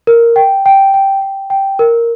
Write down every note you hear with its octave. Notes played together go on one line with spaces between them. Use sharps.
A#4
G5
G5
G5
G5
G5
A#4